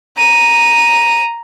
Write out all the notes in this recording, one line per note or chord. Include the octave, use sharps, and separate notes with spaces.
A#5 D#7